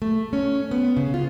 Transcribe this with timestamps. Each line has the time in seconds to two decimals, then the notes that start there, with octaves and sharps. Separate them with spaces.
0.02 A3
0.33 C#4
0.71 B3
0.97 C#3
1.14 F4